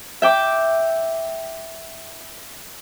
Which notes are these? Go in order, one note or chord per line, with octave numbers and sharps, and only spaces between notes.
E5 G5 D6